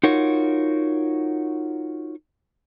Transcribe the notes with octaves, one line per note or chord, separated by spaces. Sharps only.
D#4 F4 F#4 A#4 C#5